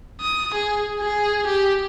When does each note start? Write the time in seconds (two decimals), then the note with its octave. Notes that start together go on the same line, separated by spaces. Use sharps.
0.21 D#6
0.54 G#4
1.00 G#4
1.47 G4